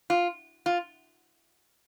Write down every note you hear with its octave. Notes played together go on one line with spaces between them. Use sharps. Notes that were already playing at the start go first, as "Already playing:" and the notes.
F4
F4